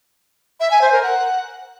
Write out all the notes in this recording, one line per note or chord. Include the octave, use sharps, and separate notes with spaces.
E5
G#5
C5
A#4
F#5